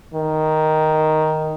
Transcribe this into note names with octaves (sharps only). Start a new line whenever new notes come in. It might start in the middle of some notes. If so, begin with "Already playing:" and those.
D#3